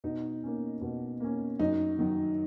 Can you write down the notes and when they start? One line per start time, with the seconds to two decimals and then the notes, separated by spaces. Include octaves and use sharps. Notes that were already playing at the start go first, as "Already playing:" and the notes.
0.04 B2 D#4
0.43 A#3 C#4
0.81 B2
1.20 A#3 C#4
1.60 F#2 D#4
1.99 D#3 F#3